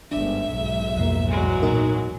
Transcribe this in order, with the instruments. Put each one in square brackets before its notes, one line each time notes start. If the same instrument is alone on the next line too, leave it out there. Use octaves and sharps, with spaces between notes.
[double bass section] G1 G#2 [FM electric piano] D4 [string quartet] E5
[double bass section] B1 G#2
[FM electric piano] F2 B2 A#3
[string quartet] E2 F#3 G#3
[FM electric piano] A#2 D#4 A#4